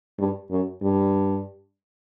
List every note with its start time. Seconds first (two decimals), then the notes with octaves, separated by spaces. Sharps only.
0.18 G2
0.50 F#2
0.82 G2